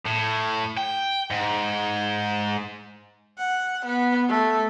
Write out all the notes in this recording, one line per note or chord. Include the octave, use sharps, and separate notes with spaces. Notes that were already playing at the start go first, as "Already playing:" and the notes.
A2
G5
G#2
F#5
B3
A3